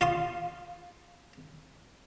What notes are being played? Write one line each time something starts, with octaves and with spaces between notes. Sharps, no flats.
F4 C6 D#6